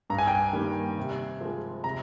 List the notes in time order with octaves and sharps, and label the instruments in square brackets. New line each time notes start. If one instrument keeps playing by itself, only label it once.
[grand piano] G2 A#5
G#5
G5
G#5
D#3 G3 A#3
C3
F3 G#3
C3 A#5